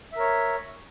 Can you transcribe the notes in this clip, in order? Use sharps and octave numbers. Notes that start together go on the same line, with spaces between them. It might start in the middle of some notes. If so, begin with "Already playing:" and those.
A#4 C#5 E5